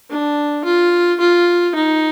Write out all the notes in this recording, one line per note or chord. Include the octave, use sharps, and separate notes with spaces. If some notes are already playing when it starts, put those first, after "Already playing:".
D4
F4
F4
D#4